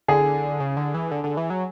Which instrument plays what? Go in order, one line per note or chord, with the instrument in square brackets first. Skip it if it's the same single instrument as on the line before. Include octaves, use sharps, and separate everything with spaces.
[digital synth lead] D3 [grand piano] G#4
[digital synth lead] C#3
D3
E3
D3
D3
E3
F#3